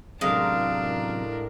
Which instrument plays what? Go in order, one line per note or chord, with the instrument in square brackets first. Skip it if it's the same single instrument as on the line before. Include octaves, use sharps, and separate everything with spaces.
[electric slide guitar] F#2 C3 F#3 [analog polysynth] A2 A#4 [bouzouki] G#3 F5 [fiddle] D4